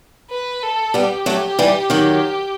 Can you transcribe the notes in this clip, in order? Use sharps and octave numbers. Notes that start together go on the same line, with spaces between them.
B4
A4
G3 B3 G4
F#3 A3
E3 G3
D#3 F#3